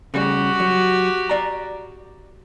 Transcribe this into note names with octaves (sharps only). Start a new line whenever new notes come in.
C#3 G3 F#4 G4
F#3
D5 A#5